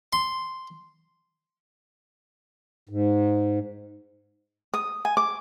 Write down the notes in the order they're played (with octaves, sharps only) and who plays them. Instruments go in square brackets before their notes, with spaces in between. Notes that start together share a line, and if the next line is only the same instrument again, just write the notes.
[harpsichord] C6
[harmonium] G#2
[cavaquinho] D#6
G#5
D6